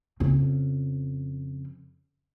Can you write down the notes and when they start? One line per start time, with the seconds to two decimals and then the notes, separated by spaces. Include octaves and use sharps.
0.20 F2 C#3